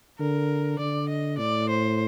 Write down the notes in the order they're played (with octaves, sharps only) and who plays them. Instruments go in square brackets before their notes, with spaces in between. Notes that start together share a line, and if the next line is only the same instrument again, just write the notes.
[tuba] D3 [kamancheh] A#4
[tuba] D3 [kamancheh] D5
[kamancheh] D#5
[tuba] A2 [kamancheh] D5
[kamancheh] C5